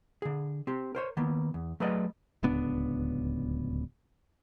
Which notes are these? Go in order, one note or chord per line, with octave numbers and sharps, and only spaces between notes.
D3 G#4
C4 G4
A#4 C5 C#5
D#3 A#3 B3
E2
F#3 A3 G#4 B4 D5 D#5
D1 C#2 B3 D4